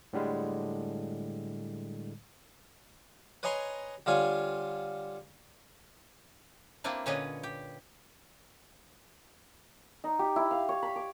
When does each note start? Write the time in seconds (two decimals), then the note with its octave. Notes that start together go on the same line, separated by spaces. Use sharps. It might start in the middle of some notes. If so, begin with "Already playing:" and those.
0.13 A2 D3 G3 G#3
3.43 B4 C#5 D#5 G#5 A#5 C6
4.06 D3 G3 F4 C#5 G#5
6.84 A#3 C4 D4 E4 B4
7.06 A#2 D3 C#4 B4 C#5 D#5
7.43 G4
10.04 D#4
10.19 G4
10.36 E4
10.51 F5
10.69 C#5
10.83 B5
10.96 D6